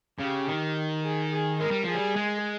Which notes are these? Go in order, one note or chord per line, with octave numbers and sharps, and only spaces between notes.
C#3 G4
D#3
G#4
G#4
G#3 A#4
G3
F3 G#4
G3
G#3